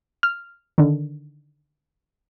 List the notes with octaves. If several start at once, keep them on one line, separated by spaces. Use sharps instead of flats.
F6
D3 D#3